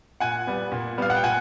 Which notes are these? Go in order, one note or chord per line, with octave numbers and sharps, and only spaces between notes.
A#2 F#5 G#5
G3 B3
A#2
G3 B3 F5
F#5
G5
A#2 F#5 G#5